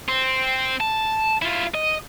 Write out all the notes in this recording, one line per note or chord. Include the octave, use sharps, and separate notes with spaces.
C4
A5
E4 F4
D#5